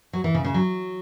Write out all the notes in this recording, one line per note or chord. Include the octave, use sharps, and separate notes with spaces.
F#3
E3
C#3
C#3
F#3